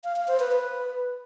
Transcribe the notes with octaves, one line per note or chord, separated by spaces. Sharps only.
F5
F5
C5
B4
B4